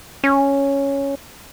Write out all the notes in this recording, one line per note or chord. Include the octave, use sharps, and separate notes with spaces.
C#4